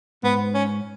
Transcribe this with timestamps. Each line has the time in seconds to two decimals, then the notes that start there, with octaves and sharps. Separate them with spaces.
0.23 G#2 B3
0.54 C#4